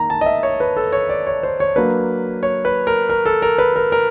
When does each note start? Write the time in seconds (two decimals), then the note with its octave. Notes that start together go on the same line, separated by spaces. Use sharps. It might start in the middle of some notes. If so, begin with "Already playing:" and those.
Already playing: D#3 A#3 A#5
0.10 A5
0.21 D#5
0.26 E5
0.43 C#5
0.60 B4
0.77 A4
0.93 C#5
1.09 D5
1.27 C#5
1.43 C5
1.60 C#5
1.76 F#3 A#3 D4 B4
2.43 C#5
2.65 B4
2.87 A#4
3.09 A#4
3.26 A4
3.42 A#4
3.58 B4
3.76 A#4
3.92 A#4